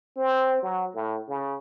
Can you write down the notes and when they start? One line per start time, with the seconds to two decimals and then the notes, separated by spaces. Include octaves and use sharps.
0.17 C4
0.63 F#3
0.95 A2
1.29 C#3